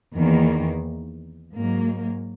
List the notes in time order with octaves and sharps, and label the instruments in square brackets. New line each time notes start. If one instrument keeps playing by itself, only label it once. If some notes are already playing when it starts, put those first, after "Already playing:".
[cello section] E2 D#3 A#3
G#2 F#3 A#3